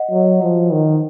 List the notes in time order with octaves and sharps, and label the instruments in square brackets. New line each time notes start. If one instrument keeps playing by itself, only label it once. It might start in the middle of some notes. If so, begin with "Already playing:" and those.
Already playing: [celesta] D#5 F#5
[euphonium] F#3
F3
D#3